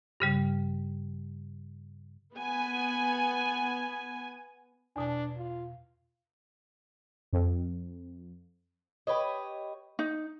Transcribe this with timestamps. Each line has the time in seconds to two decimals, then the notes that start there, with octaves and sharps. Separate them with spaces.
0.20 G2 C#3 G3
2.35 B3 G#5
4.96 E2 B2 D4 A5
5.37 F4
7.33 F2
9.07 G4 B4 C#5 D#5
9.99 D#4